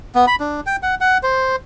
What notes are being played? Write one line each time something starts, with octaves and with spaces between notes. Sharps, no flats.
B3
B5
D4
G5
F#5
F#5
C5